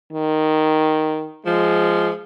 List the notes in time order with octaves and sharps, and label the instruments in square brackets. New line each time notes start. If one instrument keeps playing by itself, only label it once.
[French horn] D#3
[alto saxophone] F3 [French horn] G#3